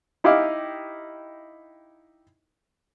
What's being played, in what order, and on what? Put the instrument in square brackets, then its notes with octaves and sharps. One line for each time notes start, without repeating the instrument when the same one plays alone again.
[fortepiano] D#4 E4 G4 D#5 F5 D6